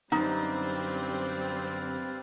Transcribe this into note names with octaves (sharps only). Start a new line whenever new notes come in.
F#2 D3 G3 C4 D#4 B4 D5 F5